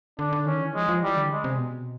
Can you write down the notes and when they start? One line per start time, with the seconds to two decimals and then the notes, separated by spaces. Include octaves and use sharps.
0.19 D3 D4
0.33 D3
0.46 D#3 C#4
0.61 E3
0.75 F3 G#3
0.89 F3
1.03 E3 G3
1.16 D3
1.31 G#3
1.44 C3
1.58 B2